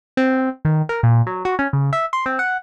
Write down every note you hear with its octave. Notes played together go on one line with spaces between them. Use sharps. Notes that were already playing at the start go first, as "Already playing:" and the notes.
C4
D#3
A#4
A#2
F#3
F#4
C#4
C#3
E5
C6
C4
F#5